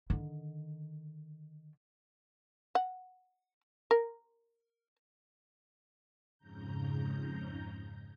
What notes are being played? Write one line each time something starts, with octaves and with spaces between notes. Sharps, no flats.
D3 D#3
F#5
A#4
F2 G#2 C#3 A#5 G6